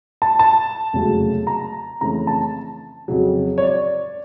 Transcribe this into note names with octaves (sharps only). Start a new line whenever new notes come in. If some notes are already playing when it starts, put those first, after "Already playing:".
A5
A5
F1 E2 C#3 F#3 A3
A#5
F2 C#3 E3 A3 C#4 A#5
A5
F2 C#3 F#3
C#5
D5